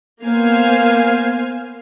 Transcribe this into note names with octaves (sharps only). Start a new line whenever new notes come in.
A#3 B3 C5 F5 G#5